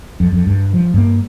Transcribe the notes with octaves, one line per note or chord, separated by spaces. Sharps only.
F2
F2
G2
F3
G2 A#3